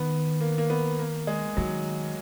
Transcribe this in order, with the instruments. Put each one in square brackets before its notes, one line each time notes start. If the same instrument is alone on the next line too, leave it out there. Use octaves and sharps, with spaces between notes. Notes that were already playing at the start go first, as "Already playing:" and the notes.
Already playing: [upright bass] D#3 [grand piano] B3
[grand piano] A#3
A#3
B3
A#3
G#3
[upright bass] D#3 [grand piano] F#3